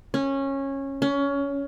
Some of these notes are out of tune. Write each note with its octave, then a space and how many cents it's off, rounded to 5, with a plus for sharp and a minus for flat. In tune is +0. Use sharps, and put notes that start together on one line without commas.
C#4 -15
C#4 +20